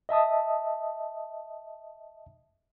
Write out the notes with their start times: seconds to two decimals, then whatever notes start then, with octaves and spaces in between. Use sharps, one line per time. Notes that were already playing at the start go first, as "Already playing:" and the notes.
0.09 D#5 E5 A5 D#6